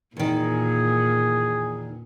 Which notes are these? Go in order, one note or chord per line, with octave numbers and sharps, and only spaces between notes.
E2 A#2 D#3 G#4